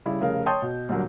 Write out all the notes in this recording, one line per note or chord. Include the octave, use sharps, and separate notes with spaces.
C#3 G3 E4
F1 C#3 A#4 F5
C#5 G5 A5 C6 D#6 G6
B2
C2 A#2 D3 F#3 A#3